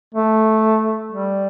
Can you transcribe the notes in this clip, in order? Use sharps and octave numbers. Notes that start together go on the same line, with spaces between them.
A3
G3